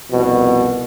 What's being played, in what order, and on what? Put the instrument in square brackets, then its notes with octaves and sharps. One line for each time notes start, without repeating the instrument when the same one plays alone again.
[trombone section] C2 F2 B2